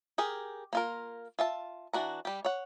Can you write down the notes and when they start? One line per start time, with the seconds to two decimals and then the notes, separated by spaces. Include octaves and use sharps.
0.18 G4 G#4 A#4
0.73 A#3 F4 A#4
1.39 F4 E5 A5
1.93 E3 D4 F#4 A#5
2.25 G3 G4
2.45 C#5 F#5